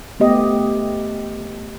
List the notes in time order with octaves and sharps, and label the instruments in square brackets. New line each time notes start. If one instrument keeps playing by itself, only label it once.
[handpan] A3 B3 G4 D#5